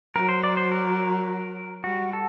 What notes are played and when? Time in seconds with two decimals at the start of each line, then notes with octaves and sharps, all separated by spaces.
0.15 F#3 A#4
0.29 C5
0.44 D5
0.57 C5
0.72 A#4
1.84 G3 F#4
2.13 A4